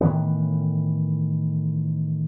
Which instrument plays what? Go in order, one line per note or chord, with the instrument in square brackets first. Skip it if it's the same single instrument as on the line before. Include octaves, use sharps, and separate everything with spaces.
[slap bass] A2 D#3 E3 B3